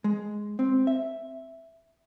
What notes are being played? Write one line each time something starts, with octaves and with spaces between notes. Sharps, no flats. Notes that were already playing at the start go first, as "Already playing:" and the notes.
G#3
C4
E5